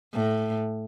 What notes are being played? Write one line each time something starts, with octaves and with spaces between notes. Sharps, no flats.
A2